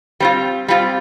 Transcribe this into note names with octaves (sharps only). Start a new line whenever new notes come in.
G3 C4 F4
G3 C4 F4